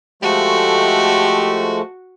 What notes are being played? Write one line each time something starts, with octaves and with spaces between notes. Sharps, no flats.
F3 G#3 A3 F#4 G4